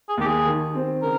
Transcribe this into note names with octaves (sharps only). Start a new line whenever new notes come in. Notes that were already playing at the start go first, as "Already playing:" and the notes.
G#4
D#2 G4
G#4
D#3
C4
C#3 A#4